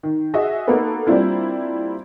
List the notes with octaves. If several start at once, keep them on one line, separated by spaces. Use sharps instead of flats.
D#3
F#4 G#4 D#5 E5
A#3 B3 D#4 F#4 A4 B4
G3 A#3 C4 D4 E4 F4